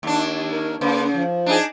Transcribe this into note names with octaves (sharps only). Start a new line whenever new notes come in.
D#2 D4
A#4
C#3 A#3 B4 C5
F3
D4 D#4 G#4